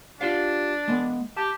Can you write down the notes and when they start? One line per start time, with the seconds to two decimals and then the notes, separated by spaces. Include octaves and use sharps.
0.21 D4 F4 G4 F5
0.88 G#3 B3
1.37 G4 A5